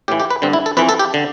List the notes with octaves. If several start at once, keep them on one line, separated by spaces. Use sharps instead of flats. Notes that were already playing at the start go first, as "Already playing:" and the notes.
A2 E3 G4
G4
B4
G2 D3 C4
E4
A4
F2 E3 B4
A4
G4
D3